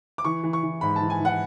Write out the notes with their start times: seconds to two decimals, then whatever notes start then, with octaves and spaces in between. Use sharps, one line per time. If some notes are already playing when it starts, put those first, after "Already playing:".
0.18 D6
0.25 E3 C#6
0.43 E3
0.53 C#6
0.63 E3
0.81 G#2 B5
0.96 A5
1.01 E3
1.10 G#5
1.20 E3 F#5